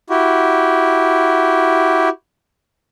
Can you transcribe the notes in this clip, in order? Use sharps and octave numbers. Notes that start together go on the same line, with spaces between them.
E4 F#4 G4